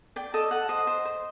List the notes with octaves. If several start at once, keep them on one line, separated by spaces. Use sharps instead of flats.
D5 G5
A4 D#5
A4 F#5
C5 D#5
C5
C5